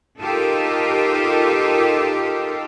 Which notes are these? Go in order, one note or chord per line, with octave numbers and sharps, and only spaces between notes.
D#4 F4 G4 A4 A#4